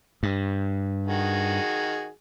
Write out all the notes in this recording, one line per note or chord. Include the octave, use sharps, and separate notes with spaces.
G2
D#3 F#4 G#4